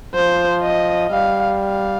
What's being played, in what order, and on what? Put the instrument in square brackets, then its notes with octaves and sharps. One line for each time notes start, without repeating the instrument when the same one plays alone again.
[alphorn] F3 [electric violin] C5
[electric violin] D#5
[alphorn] G3 [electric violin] F5
[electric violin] F5